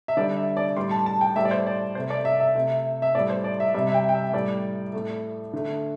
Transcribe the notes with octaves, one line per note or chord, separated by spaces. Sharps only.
E5
D3 G3 D5
E5
D5
A2 G3 C6
A5
A5
G5
A2 G3 E5
D5
C5
D5
C3 A3 C5
D5
E5
E5
C3 A3 E5
E5
A2 G3 D5
C5
D5
E5
C3 G3 E5
E5
G5
G5
E5
A2 G3 D5
A2 A3
D3 A3